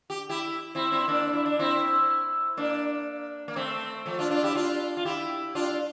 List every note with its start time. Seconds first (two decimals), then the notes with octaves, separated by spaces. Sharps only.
0.10 G4
0.29 E4 G4
0.75 C4 E4
0.92 C4 E4
1.08 A#3 D4
1.33 E4
1.46 D4
1.59 C4 E4
2.57 A#3 D4
3.48 A#3
3.56 A3 C4
4.06 F3 A3
4.19 D4 F4
4.30 D4 F4
4.43 E4 G4
4.55 D4 F4
4.97 F4
5.05 E4 G4
5.55 D4 F4